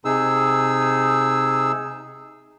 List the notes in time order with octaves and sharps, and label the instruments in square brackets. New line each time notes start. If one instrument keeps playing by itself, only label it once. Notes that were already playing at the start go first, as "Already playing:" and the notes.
[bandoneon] C3 D#4 G#4 E6